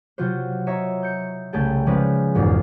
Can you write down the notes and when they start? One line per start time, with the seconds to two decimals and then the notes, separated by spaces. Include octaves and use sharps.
0.18 C3 F#3 F4 F#4 C5
0.67 C#5 D#5 E5 A#5
1.03 G6 C#7
1.53 C2 C#3 A3 G#4 G5 A5
1.86 F3 G#3 C#4 F4 B4 D5
2.35 E1 A#1 F2 G#2 C7